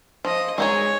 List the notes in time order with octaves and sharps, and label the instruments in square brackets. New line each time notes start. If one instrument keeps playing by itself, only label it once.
[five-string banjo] F3 [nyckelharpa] D#5
[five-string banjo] G#3 D#4 G#4 [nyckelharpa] C#5